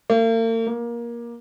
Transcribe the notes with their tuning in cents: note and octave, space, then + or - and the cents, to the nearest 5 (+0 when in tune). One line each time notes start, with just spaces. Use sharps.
A#3 -45
A#3 +20